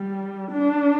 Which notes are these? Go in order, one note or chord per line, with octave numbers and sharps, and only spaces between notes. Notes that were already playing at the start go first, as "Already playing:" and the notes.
Already playing: G3
D4